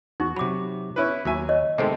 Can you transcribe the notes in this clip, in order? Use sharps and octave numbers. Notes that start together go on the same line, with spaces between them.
E2 D#4 F#4
C3 F#3 B5 D6
C#4 E4 B4
D#2 F#3 E5 G#5
C#5 D#5
C3 D#3 G#3 A3 C4 A4